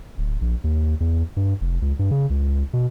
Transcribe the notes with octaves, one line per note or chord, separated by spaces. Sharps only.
D1
A#1
D#2
E2
G2
F1
C#2
G2
C#3
C#2
B2